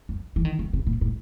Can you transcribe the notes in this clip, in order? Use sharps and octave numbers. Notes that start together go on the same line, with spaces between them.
F#2
E3
D#3
C#3
C3
A#2
A2